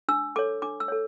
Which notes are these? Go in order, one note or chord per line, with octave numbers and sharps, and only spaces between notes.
D4 E6
A4 C#5 D6
D4 D6
E6
A4 C#5